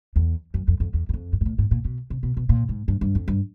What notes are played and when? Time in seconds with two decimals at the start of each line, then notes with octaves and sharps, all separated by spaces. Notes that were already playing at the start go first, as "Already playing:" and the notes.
0.16 E2
0.54 F#2
0.68 F2
0.80 F2
0.94 E2
1.09 E2
1.14 F2
1.33 G2
1.41 G#2
1.46 A2
1.58 G#2
1.71 A#2
1.85 B2
2.10 C3
2.23 B2
2.37 B2
2.49 A#2
2.69 G#2
2.88 G2
3.01 G2
3.15 F2
3.28 G2